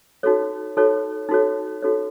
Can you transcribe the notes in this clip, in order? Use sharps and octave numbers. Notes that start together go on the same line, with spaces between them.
D#4 F#4 A4 C#5
D#4 F#4 A4 C#5
D#4 F#4 A4 C#5
D#4 F#4 A4 C#5